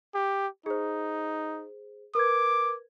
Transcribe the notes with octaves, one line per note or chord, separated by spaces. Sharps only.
G4
D#4 G#4 C5
A#4 B4 D6 G#6